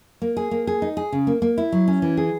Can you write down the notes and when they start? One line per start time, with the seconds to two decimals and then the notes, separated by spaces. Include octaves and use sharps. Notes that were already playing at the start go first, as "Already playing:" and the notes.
0.22 A#3
0.37 G#4
0.51 A#3
0.67 G#4
0.82 D#4
0.97 G#4
1.12 C#3
1.27 A#3
1.42 A#3
1.58 E4
1.72 F#3
1.88 C#4
2.02 E3
2.17 G#4